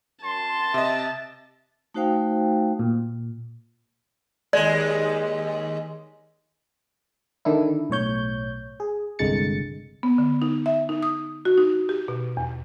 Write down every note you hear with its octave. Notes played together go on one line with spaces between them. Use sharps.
F#2 A5 C6
C3 D#5 E5
A3 D#4 F#4 C5 F5 G5
A#2
D#2 G#3 D5
D3 D#3 D4 E4
B1 A2 C#5 G6
G#4
G1 C2 D3 G#3 A6 C#7
B3
D3
D#4
E5
D#4
D#6
F#4
D#4
G4
B2
E2